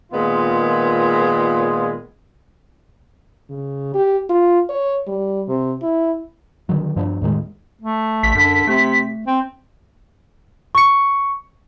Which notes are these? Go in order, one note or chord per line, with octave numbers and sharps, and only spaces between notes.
A#2 D#3 G#3 B3 F4 G#4
C#3
G4
F4
C#5
G3
C3
E4
D3 D#3 F#3
G2 F3 B3 D4
E2 A2 D#3 G#3
A3
A1 B6
F#2 D3
C3 A3
C4
C#6 C#7